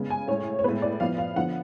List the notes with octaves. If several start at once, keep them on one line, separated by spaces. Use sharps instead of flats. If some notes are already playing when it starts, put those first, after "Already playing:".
Already playing: C#3 G#3 B3
G#5
A2 G#3 C#4 C#5
C#5
A2 G#3 B3 B4
D5
F3 B3 F5
F5
D3 F3 B3 F#5